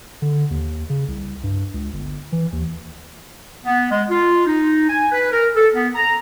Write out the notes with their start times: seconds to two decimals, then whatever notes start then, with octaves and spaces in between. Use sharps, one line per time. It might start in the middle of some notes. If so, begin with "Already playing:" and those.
0.22 D3
0.50 D#2
0.90 C#3
1.08 C2
1.43 G2
1.74 C#2
1.93 G1
2.32 E3
2.52 D#2
3.65 B3
3.90 G#3
4.09 F4
4.46 D#4
4.89 G#5
5.11 B4
5.31 A#4
5.55 A4
5.74 B3
5.95 A#5